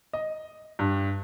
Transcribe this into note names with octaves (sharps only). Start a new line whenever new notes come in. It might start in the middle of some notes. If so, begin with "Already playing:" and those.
D#5
G2